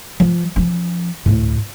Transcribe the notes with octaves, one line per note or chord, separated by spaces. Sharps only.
F3
F3 C#4
D2 A2